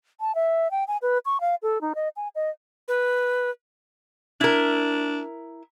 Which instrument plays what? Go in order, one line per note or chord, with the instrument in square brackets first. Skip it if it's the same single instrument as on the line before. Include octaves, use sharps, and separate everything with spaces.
[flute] A5
E5
G5
G#5
B4
C#6
F5
A4
D#4
D#5
G#5
D#5
[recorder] B4
[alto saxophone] D4 [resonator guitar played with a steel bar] E4 A#4